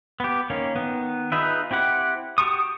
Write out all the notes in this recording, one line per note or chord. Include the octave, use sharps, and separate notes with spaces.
B3 G4
D#3 A#3 C#4
D#3 B3
D#4 F4 G#4 B4 E5
C4 E4 G4 F#5
F#4 G4 A5 C#6 D#6